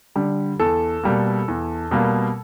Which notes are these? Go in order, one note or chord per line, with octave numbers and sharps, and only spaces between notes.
D3 G3
E2 A4
B2 G3 A#3
E2
B2 G3 A#3